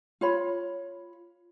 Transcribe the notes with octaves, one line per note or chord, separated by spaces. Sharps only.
F4 C#5 B5